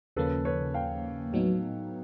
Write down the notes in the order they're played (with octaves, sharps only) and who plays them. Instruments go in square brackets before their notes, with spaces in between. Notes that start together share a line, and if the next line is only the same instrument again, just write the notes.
[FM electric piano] D#2 C#3 F3 A#3 C#4 [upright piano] A4 B4
[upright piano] B4 C#5
F5 G5
[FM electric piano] A2 F#3 B3 D#4